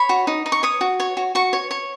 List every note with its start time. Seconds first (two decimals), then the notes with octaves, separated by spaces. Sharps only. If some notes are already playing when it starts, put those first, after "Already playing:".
Already playing: C#5 B5
0.09 F#4
0.27 D#4
0.46 D#4
0.52 C#6
0.63 C#5 D#6
0.81 F#4
1.00 C#5
1.17 F#4
1.35 F#4 C#6
1.53 C#5
1.71 C#5